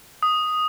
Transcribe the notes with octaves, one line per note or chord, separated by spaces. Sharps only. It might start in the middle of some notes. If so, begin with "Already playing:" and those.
D#6